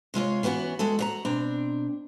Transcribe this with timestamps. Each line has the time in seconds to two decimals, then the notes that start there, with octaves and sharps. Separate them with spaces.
0.14 C3 G#3 F4 C#5
0.43 E3 B3 C#4 D4 F#4
0.79 G#3 F#4 A4
0.99 F#4 C#5 A#5
1.25 B2 C4 D4 A#5